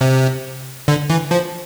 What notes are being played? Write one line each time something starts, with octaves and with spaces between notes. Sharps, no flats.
C3
D3
E3
F3